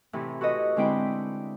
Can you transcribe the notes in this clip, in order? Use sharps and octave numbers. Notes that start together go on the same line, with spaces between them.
A2 C3 E3
F#4 A4 B4 D#5
D3 G#3 C4 E4 G5 B5